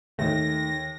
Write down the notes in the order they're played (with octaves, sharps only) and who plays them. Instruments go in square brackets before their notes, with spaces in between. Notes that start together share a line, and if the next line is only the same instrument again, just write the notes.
[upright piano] D#2 [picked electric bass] D#3 A3 [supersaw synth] A#6